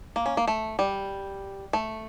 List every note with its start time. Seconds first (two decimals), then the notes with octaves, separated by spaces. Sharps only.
0.16 A#3
0.26 C#4
0.37 A#3
0.47 A3
0.79 G3
1.73 A3